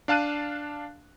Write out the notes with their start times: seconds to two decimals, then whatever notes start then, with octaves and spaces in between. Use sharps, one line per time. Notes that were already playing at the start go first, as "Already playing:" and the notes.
0.08 D4 F5 A5 F#6 D#7